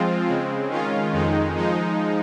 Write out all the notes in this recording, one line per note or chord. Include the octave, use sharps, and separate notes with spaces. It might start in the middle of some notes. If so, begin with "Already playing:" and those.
Already playing: F3 G#3 C4 F4
C#3 G#3 C4
D#3 G#3 C#4 F4
F2 D#3 G#3 D#4
F3 G#3 D#4